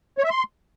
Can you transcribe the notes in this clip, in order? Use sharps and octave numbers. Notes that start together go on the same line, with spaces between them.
C#5
E5
C6